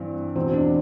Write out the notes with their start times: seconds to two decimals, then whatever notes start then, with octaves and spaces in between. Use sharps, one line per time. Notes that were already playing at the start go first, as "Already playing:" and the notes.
Already playing: G2 E3 C4
0.36 E2 B2 C4
0.53 D4